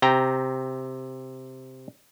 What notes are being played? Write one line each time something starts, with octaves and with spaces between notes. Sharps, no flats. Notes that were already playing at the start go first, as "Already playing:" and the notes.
C3 G5 A#5